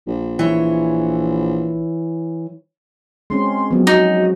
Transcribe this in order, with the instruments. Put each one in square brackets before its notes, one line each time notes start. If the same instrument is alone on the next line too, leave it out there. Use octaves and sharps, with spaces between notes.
[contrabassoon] A#1
[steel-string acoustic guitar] E3 C#5
[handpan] G#3 C4 C#4 [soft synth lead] C6
[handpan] F3 F#3 [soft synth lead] B3
[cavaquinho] D#4 [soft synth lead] F#4